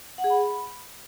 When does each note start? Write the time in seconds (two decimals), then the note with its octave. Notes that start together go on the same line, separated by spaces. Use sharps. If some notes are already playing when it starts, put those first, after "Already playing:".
0.18 F#5
0.24 G#4
0.30 B5